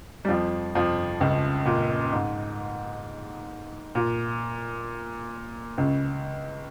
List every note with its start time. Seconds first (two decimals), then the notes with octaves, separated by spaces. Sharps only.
0.25 G3
0.28 F2 F3
0.75 F2 F3
1.20 C#2 C#3
1.66 A#2
2.12 G#2
3.95 A#2
5.78 C#2 C#3